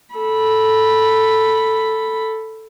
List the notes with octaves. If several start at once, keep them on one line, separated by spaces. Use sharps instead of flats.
A4 B5